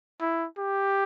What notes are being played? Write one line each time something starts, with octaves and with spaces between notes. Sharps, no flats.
E4
G4